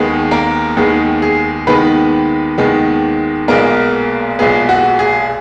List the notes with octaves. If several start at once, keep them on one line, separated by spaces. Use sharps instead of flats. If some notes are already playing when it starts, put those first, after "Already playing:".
Already playing: D#2 D#3 G#3 B3 G#4
A#3 A#4
D#2 D#3 G#3 B3 G#4
G#4
D#2 D#3 G#3 B3 B4
D#2 D#3 G#3 B3
B1 A#2 G#3 A#3 B3 A#4
B1 A#2 G#3 B3 G#4
F#4
G#4